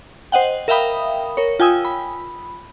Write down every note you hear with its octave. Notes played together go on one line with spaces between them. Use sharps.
C5 D#5 F#5 G5
A#4 E5 F5 G5 B5 D#6
A#4 C#5
F4 G5 G#5 D#6 E6
B5